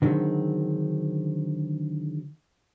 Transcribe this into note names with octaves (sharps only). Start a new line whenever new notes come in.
D3 D#3 F#3 G#3 C4